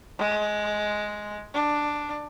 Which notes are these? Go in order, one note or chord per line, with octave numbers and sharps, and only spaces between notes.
G#3
D4